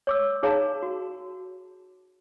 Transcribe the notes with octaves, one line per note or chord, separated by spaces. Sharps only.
C#5 D6 E6
D#4 G#4 C#5 F5 A5 A#5
F#4